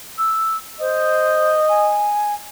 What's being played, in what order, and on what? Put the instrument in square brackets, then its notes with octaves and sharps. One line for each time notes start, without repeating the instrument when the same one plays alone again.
[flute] E6
[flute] C5 [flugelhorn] D#5
[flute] G#5